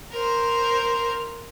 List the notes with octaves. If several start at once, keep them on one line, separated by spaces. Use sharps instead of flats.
A#4 C5